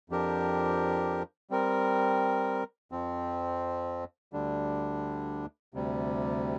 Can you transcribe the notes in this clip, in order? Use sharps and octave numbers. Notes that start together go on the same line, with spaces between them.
F2 F3 D4 G4 A#4
G3 C4 A#4
F2 F3 C4
D2 D3 G3 D4
D2 C3 G3